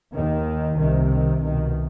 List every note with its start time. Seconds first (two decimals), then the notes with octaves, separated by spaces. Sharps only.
0.14 D#2 D#3
0.78 C2 C3 D#3
1.10 D#3
1.42 C2 B2 D#3